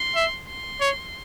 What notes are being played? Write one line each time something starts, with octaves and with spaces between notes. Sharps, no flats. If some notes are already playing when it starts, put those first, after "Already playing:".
Already playing: C6
E5
C6
C#5